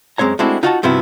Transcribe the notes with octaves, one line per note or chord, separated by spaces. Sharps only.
F#2 G#3 C4 C#5 A#5
G#3 A3 C4 D4 E4 F#4
D#4 F4 F#4 D#5 F#5 A5
G2 C3 F3 B3 E4 F#4